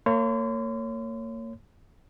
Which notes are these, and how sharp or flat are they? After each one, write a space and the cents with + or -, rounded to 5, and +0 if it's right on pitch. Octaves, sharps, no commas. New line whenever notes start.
A#3 -35 C#5 +0 C6 -40